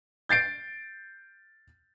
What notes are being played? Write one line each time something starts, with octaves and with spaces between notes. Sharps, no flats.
G6 A6 C7 D7